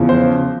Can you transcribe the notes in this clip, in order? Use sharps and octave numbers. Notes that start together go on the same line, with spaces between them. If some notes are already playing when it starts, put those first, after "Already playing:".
Already playing: E2 C#3 F3
C5